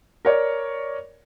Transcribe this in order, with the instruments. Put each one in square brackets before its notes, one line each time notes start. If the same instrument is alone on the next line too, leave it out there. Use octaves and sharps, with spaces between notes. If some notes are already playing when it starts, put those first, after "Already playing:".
[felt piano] A#4 C#5 D5